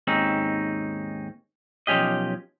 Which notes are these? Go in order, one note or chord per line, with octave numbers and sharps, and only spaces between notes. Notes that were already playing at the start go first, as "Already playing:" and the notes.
D#2 G#2 C4 C#4 D#4
B1 F3 C4 C#4 G4 D#5